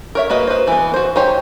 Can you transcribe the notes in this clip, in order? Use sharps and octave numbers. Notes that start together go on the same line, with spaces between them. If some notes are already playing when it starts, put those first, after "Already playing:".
A#4 C#5 E5
A#3 F#4 B4 D#5
B4 C5
E3 B3
F#4 C5
D#4 G4 C5 C#5